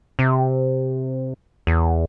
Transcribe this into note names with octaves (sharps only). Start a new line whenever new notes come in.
C3
E2